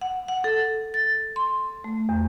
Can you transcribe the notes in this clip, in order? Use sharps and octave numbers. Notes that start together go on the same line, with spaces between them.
F#5
F#5
A4
A6
C6
A3
E2